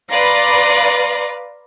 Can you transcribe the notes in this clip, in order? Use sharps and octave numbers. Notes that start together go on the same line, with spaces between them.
B4 D5 F5 A#5 C6